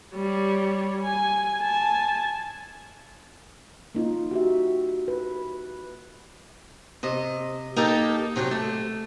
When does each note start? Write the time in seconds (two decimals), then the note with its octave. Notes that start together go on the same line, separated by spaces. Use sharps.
0.15 G3 C#5
1.02 G#5
1.60 G#5 A5
3.95 A#3 D#4 F4
4.31 F#4 G4 E5
5.08 B4
7.03 C3 D#5
7.76 A#3 D#4 G4 A4
8.36 C3 F#3 G4 C#5
8.51 A3